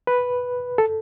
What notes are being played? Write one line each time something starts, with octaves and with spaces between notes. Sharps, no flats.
B4
A4